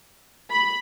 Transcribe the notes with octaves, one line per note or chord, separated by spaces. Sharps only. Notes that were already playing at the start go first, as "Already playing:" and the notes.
B5